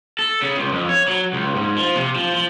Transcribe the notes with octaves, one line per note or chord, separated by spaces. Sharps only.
A4
C#3
C#2
F2
C#5
F#3
C#2
G#2
F3
C3
F3
F3